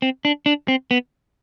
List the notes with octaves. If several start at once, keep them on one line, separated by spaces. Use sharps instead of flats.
C4
D4
D4
C4
B3